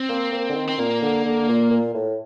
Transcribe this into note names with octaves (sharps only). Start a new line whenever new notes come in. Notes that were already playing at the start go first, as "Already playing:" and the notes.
Already playing: C4
A#3
A#3
D3
D#3
C4
A#2 A#3
D3
D3
A#2
A#2
A2